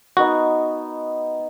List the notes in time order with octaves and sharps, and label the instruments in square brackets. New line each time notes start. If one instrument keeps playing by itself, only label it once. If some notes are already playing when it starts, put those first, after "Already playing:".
[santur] B3 D#4 C#6 [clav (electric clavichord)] F#4